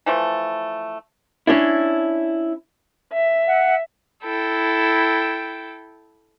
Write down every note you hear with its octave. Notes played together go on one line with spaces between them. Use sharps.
E3 F3 A3
C#4 D4 E4
E5
F#5
E4 A4 G5